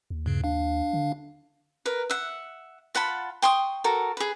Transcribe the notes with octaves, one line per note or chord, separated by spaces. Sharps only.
D#2
G2 C#3
D4 F5
D3
A#4 B4
E5 F#5
F4 F#5 A5 B5
G5 C6 C#6 D#6
F#4 A4 A#4
G#4 B4